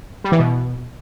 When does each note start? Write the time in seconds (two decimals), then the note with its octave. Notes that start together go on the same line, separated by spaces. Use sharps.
0.24 G3
0.32 E3
0.39 B2